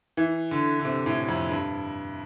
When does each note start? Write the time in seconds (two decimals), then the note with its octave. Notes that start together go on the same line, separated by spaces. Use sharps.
0.17 E3
0.51 D3
0.79 D3
0.85 C3
1.06 A2
1.29 F2
1.50 G2